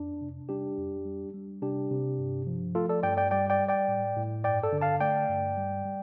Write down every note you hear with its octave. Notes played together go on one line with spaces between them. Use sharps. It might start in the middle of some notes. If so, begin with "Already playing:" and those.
Already playing: F2 D4
C3
G3 D4 G4
F2
G3
G3
C3 D4 G4
C3
G2
F3
A3 F4 A4
A4 D5
G2 D5 G5
D5 G5
G3 D5 G5
D5 G5
G3
D5 G5
A2
A2
G2 D5 G5
A4 D5
D3
F5 A5
A3 D5 G5
G2
G3
G3